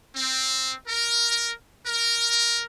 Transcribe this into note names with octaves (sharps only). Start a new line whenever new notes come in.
C4
A#4
A#4